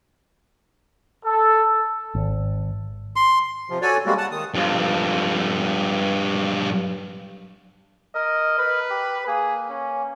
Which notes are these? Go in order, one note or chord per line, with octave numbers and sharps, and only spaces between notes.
A4
G#1
C6
C3 F3
F#4 A4 C#5 D5 G#5
C3 G3 G#3 A#3 F#4
F#5 A5
D#3 D#6
G2 F3
A#4 D#5
B4
G4
A#3 G#4
C#4